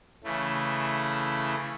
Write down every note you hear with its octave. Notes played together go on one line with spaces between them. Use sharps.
C#3 E3 A3